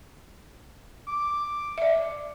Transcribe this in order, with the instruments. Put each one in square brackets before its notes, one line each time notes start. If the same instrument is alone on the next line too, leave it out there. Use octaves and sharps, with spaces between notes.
[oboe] D6
[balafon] D5 E5